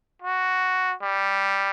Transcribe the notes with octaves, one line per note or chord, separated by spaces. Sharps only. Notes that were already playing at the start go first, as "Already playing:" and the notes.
F#4
G3